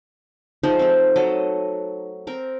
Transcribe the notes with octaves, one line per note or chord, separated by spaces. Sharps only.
F3 G#3 D#4 C5
A3 C4
F#3 A4 D#5
C4 A#4